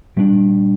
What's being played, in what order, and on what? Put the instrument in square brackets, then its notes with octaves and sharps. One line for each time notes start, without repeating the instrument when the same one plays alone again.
[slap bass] A#2 G3 A#3 D4